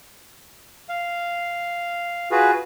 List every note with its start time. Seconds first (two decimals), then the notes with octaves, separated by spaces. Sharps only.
0.89 F5
2.31 F4 F#4 G#4 B4